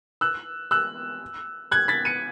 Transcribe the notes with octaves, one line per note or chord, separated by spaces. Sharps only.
E6 F#6
E6 F#6
F#6 G#6
A6 B6
C#7 D#7